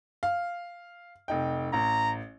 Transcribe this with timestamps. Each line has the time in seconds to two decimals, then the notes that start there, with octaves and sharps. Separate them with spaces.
0.23 F5
1.28 F1 D#4 G5
1.73 A1 A#5